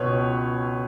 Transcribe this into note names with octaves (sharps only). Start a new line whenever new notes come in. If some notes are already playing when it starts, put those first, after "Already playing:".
Already playing: C#2 B2 B4 C#5